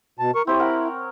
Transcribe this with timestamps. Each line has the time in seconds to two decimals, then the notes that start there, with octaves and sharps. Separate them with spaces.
0.19 B2 A5
0.35 A#4 C#6
0.47 C4 E4 G4 C#5
0.60 A#4 F#5